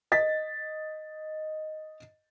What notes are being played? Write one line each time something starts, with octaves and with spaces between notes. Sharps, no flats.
D#5 A6 B6